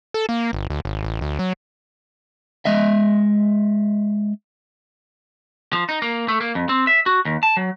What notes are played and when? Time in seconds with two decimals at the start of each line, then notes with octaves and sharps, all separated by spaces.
0.14 A4
0.29 A#3
0.53 G1
0.70 D2
0.85 G#1
1.04 A1
1.21 D2
1.39 F#3
2.65 G#3 D#5 E5
5.73 F3
5.89 D#4
6.02 A#3
6.28 A3
6.41 A#3
6.55 F2
6.69 C4
6.87 E5
7.06 F#4
7.25 D#2
7.43 A5
7.57 F#3